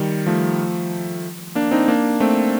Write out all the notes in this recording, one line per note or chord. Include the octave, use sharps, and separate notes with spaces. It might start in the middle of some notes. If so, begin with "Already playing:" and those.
Already playing: D#3 G3
F3 A3
A#3 D4
C4 D#4
A#3 D4
A3 C4